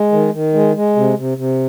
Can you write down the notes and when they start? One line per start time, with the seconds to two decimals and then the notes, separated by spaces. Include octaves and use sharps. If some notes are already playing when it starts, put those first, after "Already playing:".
Already playing: G#3
0.12 D#3
0.33 D#3
0.54 G#3
0.75 G#3
0.96 C3
1.17 C3
1.38 C3